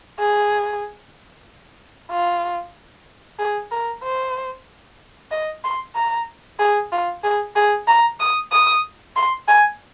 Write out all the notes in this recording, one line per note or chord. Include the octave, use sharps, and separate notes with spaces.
G#4
F4
G#4
A#4
C5
D#5
C6
A#5
G#4
F4
G#4
G#4
A#5
D#6
D#6
C6
G#5